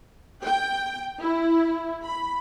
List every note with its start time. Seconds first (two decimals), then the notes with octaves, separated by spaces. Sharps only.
0.44 G5
1.22 E4
2.04 B5